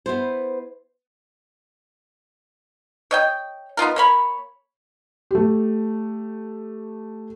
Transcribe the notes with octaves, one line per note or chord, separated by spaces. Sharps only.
B3 E4 C5
C#5 D#5 G5
B3 D#4 F4 A#4
A#3 C#5 B5
A3 G4